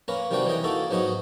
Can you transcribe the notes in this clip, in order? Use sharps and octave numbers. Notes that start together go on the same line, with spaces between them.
A#3 C#4 A#4 B4
C3 D#3 G3 D4 F#4 G5
E3 C#4 D#5 G5
A#3 D#4 F#4 A4
G#2 F#3 B3 D#4 F#4 D#5